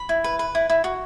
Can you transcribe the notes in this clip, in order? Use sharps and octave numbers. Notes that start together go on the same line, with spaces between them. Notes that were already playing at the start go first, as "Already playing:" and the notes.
Already playing: B5
E4
B4
B4
E4
E4
F#4